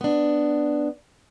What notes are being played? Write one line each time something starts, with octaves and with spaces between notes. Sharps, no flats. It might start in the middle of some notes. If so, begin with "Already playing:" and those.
B3 D4